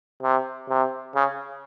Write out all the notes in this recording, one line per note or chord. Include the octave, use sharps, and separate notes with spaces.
C3
C3
C#3